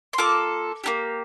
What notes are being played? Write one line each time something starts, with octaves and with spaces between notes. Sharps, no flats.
C6
A#3 F4 A4 D6
A#3 D#4 G4